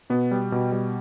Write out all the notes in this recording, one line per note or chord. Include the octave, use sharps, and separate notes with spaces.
B2 B3
G3
B2
G3